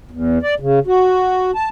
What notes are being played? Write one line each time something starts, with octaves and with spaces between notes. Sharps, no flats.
E2
D5
C#3
F#4
A5